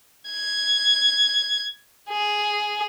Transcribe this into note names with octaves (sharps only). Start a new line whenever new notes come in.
G#6
G#4